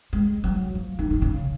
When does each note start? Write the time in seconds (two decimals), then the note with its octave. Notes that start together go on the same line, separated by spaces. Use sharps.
0.13 G#3
0.44 F#3
0.75 F3
0.99 D#3
1.11 D#3
1.22 C#3